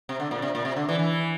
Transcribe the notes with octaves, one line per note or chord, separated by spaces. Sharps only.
C3
D3
A#2
C3
A#2
C3
D3
E3
E3